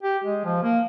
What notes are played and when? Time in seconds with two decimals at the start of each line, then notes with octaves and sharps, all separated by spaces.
0.03 G4
0.24 G#3
0.45 F3
0.63 A#3